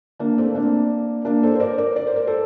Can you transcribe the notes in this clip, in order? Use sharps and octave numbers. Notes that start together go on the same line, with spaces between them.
A#3 D4
A3 C4
A#3 D4
A#3 D4
A4 C5
C5
A#4 D5
A#4 D5
D5
C5
A#4
A4 C5